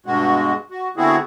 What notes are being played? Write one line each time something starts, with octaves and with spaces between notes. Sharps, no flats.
G2 B2 G#3 F#4
F#4
D3 B3 C4 E4 F#4 G#4